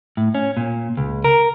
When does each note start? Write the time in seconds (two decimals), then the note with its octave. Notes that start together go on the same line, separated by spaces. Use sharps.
0.17 A2
0.35 C#4
0.57 A#2
0.97 C#2
1.24 A#4